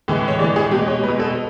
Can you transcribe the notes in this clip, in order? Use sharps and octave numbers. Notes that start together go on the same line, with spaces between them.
A2 E3 G#3
C#5
A2 E3 G#3 D5
G#4
B2 G#3 G4
C#5
B2 G#3 B4
A4